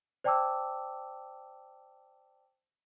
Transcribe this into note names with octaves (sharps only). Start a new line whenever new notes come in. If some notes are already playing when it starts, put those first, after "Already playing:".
C5 D5 G5 A5 D6 E6